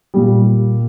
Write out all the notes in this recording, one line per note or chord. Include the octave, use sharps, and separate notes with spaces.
A#2 G3